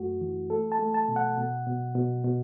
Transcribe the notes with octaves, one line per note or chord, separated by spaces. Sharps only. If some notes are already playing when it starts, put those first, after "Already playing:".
Already playing: F#2 A3 F#4
E3
A3 A4
A5
A3
A5
B2
F#5
B2
B2
B2
B2